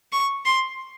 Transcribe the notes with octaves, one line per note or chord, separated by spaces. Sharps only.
C#6
C6